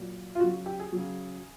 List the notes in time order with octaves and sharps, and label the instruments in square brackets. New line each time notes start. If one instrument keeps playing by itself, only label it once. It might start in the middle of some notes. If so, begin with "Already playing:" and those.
Already playing: [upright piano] A#2 F#3
F4
C#3 F#3 F#4
G4
G#4
C#3 F#3